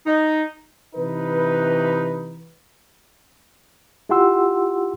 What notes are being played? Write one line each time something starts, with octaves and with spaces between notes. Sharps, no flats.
D#4
C3 E3 D#4 B4
E4 F4 G4 F#5 C6 E6